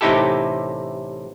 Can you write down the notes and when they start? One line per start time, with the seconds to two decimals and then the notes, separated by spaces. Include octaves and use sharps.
0.01 A1 C3 D#4 E4 G4 A4